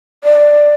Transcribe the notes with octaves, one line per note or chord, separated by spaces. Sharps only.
D5